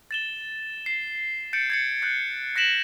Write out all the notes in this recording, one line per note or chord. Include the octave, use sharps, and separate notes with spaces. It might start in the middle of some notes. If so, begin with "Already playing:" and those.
A6 E7 G7
C7
G6 A6 C#7 D7
G#6 A6 C#7
F#6 G6 A6
F#6 A#6 B6 D7 E7 F#7